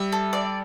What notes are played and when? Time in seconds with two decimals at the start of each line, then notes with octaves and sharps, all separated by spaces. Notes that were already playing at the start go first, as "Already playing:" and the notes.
Already playing: G3 E5
0.12 A4
0.33 D5